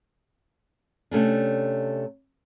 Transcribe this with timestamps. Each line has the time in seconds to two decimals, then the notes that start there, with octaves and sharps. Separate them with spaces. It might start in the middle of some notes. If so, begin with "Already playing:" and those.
1.11 C3 A3 C#4 D4